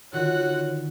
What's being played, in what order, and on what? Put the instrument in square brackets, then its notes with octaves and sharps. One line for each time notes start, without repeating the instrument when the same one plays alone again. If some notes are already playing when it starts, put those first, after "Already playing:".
[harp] D3 D#3 [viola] F4 [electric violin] F#4 F#5 [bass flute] C#5